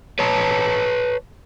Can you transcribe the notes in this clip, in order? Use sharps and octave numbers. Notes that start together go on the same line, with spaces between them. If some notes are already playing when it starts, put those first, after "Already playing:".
B4 C#5 A5 A#5